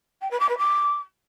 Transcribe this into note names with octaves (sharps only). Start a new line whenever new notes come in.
G5
B4
D6
B4
D6